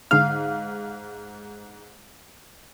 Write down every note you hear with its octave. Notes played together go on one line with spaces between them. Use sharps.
G#2 D3 F5 F6